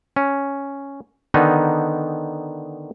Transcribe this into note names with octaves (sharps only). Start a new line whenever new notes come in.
C#4
D3 D#3 B3 D#4